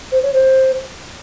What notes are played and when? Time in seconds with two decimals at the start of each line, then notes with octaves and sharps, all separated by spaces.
0.12 C5
0.22 C#5
0.33 C5